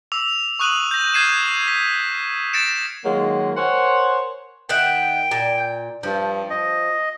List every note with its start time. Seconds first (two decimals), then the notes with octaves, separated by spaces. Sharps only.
0.12 D6 E6 F7
0.59 C#6 D#6 F#6 D#7 F7 F#7
0.91 G6 A#6
1.14 F6 G6 G#6 C7 D#7 E7
1.68 B6
2.53 A6 A#6 C#7 D7 E7
3.04 D#3 F#3 G#3 A#3 F4
3.57 A#4 C5 C#5 F#5 G#5
4.69 D#3 E5 F#5 G5
5.31 A#2
6.03 G2 F3
6.50 D#5